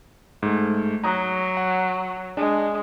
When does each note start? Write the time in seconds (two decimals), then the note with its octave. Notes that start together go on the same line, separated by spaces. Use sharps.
0.43 G#2 A3
1.04 F#3 A#5 D#6 F#6
1.57 F#5
2.37 G#3 D4